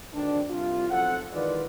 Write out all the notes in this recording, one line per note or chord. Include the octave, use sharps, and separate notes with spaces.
G#1 D3 D#3 C4 D4
C2 F4
B1 F2 F3 A4 F#5
D#3 E3 G#3 F4 B4 D5